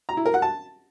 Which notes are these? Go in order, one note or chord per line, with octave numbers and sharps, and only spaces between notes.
A#5
E4
A#4
F#5
A5